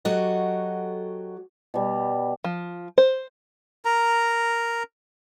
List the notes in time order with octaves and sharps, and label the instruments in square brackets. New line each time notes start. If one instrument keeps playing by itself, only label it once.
[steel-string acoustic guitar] F#3 F#4 G4 A4 D#5
[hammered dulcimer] B2 G3
[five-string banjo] F3
C5
[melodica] A#4 A#5